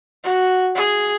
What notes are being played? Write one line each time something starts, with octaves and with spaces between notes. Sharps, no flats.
F#4
G#4